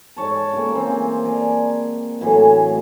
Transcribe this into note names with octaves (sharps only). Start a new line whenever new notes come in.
G#2 C#5 A5
C#3 A#3
E3 C4
G#4 D5 A#5
A2 E3 F#3 G#4